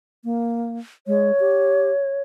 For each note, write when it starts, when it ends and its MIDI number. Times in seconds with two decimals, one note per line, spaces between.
0.24 0.79 58
1.07 1.32 56
1.07 2.22 73
1.40 1.92 67